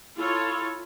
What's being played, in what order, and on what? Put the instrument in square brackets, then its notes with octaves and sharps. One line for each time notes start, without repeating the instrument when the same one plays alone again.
[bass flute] E4 [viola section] F4 A4 C#5